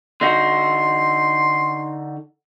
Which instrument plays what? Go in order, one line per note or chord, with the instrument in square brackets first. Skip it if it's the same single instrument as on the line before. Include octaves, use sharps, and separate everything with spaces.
[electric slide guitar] D3 D#4 F#4 [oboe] C6